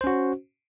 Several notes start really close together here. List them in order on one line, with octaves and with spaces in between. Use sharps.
C5 C#4 F#4